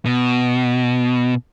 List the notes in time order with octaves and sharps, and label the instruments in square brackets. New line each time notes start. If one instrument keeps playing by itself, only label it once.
[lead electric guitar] B2